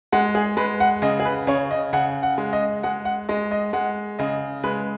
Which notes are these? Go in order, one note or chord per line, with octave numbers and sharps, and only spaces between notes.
G#3 F#5
G#4
G#3 B4
F#5
C#3 D#5
G#4
B4
C#3 C#5
D#5
C#3 F#5
F#5
G#3
D#5
G#3 F#5
F#5
G#3 D#5
D#5
G#3 F#5
C#3 D#5
G#3 B4